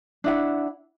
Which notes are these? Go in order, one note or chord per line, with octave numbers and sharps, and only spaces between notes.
D4 E4 F#5